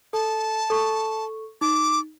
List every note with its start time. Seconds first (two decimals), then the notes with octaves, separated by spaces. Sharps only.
0.13 A4 A5
0.70 A4 C#6
1.61 D#4 D6